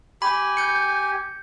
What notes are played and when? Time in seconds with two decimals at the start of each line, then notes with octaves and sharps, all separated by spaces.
0.22 G4 G#5 B5
0.57 G6 C#7